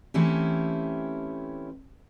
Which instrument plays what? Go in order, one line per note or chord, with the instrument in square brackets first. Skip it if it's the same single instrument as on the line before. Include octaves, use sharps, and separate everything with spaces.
[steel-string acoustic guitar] E3 A3 C4 C#4 E4 G4